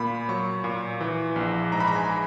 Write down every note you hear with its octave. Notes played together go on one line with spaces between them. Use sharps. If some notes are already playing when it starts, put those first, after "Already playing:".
Already playing: A#2 A#3 B5
F#3 C#6
A#2
E3
A#1
G#2 A#5
B5
A#5
G#5